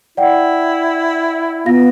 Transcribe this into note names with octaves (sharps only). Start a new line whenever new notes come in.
E4 D5 F#5 G5
B3 F4 F5 A#6